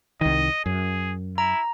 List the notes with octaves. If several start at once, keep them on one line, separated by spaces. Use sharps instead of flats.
C2 D#3 D#5
F#2 G#4
E4 A#5